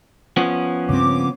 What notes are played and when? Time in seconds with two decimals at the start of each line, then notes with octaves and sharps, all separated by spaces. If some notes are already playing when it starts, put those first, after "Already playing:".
0.37 F3 B3 C#4
0.89 G2 C#3 C4 D6